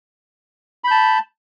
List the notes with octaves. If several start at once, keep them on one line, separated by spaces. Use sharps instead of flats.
A5 B5 G6